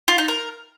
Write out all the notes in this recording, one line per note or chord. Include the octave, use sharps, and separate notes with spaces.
F4
D#4
A#4